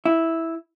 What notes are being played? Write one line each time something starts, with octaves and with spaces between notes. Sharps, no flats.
E4